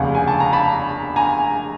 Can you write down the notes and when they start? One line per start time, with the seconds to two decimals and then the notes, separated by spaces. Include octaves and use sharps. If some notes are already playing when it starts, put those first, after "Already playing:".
Already playing: F1 D#2 C#3 F#5 G#5
0.15 G#5
0.28 A5
0.40 A#5
0.53 A5 B5
1.16 G#5 A#5